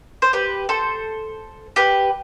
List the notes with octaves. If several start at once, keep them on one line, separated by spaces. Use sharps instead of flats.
C5
G4 B4
A4 C5
G4 B4